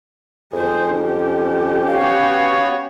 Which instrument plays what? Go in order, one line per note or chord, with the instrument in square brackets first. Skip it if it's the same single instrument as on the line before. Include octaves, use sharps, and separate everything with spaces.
[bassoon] F2 [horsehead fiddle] G#4 C5
[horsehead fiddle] C#4 G4
[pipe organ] B3 F#4 C#5 [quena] F5